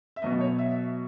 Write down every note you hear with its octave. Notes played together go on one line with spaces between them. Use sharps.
E5
B2 F#3 B3 D#5
C#5
E5